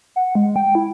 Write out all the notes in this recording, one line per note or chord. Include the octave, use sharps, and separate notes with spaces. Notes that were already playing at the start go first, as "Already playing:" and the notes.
F#5
G#3
G5
E4